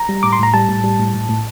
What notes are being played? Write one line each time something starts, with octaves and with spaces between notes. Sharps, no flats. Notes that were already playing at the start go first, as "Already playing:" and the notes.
Already playing: A#5
G3
A2 D6
C6
A2 A#5
G3 A5
A2
G3
A2
A2
A2